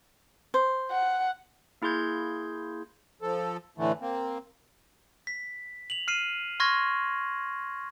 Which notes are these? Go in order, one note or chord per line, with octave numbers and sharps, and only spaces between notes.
C5
F#5
A#3 E4 G#4 C6 G6 G#6
F3 A4
A2 D3 E3 A3
A#3 C4
B6
F7 F#7
F6 C7 D#7
C6 C#6 F6 G#6 A#6